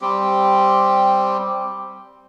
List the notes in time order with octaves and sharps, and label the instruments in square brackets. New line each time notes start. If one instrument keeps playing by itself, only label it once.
[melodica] G3 C4 G4